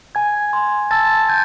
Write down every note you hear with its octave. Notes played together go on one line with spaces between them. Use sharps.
G#5 G#6
C6
A5 E6 A6
G6 G#6